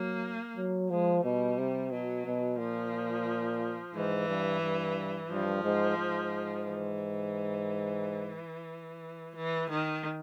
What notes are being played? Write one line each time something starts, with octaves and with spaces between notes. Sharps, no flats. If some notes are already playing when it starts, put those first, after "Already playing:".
Already playing: F#3 A#3
F#3
F3 G#3
B2 G3
C3
B2 F#3
B2
A#2 F3
G#2 E3
G2
G2
G2 F3
G#2
G#2
E3
E3
D#3